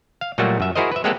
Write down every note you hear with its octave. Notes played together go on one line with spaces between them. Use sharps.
F5
A#2 F#3 G3 A3 A#3 F#4
F#2 E5
E4 F#4 G#4 A#4 C5 D#5
B4 E5
G#3 A#3 C4 G4 A4 F#5